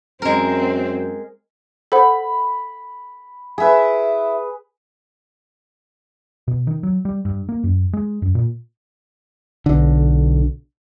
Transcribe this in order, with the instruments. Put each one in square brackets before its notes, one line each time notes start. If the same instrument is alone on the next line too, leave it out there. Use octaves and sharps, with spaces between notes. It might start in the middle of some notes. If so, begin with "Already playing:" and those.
[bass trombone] F#2 [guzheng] G#3 A#4 [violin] C4
[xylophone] A4 C5 F#5 [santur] B5
[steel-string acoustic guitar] E4 E5 [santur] G#4 B4
[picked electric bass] B2
D#3
F#3
G3
G2
A#3
F#2
G#3
F#2
A#2
[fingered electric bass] B1 D3